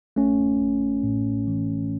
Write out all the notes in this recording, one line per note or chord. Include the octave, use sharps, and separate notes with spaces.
A1 A3 C#4
A1
A2
E3